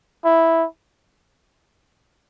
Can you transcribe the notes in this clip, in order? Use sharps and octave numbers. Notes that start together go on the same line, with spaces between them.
E4